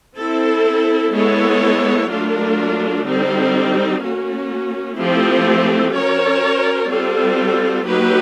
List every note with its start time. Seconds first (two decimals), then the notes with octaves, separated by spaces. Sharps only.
0.19 C4 E4 A4
1.14 G#3 B3 E4 A4 C#5
2.10 F#3 A3 D4 F4 A#4
3.06 D3 G3 C4 D#4
4.02 A#3 C#4 F#4
4.98 F3 A3 C4 E4 G4
5.94 C#4 F#4 A#4 C#5
6.90 G3 C4 F4 A4
7.85 F#3 A#3 D#4 G4 B4